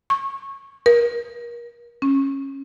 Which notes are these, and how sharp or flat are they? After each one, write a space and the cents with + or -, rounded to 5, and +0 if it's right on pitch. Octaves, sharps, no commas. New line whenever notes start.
C#6 -15
A#4 +30
C#4 -20